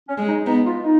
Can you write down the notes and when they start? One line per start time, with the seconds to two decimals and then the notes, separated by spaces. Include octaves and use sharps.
0.08 C#4
0.18 G#3
0.28 D#4
0.46 B3 D#4
0.65 F4
0.84 D#4